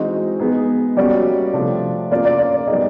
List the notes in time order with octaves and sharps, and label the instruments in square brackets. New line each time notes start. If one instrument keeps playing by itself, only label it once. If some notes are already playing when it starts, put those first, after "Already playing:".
Already playing: [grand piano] E3 G#3 C4 D#4 F#4 [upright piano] D#5
[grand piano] G#3 B3 D#4 G#4
[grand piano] G3 A#3 C#4 F#4 [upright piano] D5
[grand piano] C3 F3 A3 D4
[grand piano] A#3 C#4 F4 [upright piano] D5
[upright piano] D5
D5
D5
[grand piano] G3 B3 D#4 G#4 [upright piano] D#5